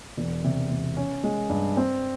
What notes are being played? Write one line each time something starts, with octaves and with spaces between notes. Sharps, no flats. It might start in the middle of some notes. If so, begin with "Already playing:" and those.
E1
C3
E1
C#4
G#3
G2
C4